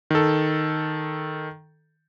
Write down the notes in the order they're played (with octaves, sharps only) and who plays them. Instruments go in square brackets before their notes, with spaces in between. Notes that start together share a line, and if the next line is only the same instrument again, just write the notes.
[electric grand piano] D#3 A4